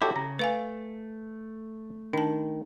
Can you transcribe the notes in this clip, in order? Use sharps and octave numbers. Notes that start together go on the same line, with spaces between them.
E4 F#4 G4 A4 C#5
C#3 A#5
A3 B4 F5 G#5
D#3 D4 A5